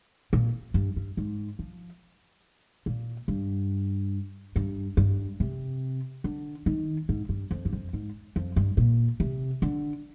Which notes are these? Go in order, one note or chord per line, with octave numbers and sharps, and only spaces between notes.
A#2
G2
G2
G#2
F3
A#2
G2
G2
G2
C3
D3
D#3
G#2
G2
F2
G2
F2
G#2
F2
G2
A#2
C3
D3